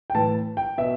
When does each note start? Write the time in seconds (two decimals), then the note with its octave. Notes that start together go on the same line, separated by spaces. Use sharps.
0.10 G5
0.15 A2 E3 A5
0.57 G5
0.78 B2 E5